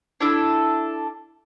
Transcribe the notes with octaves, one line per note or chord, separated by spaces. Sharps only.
D4 E4 A4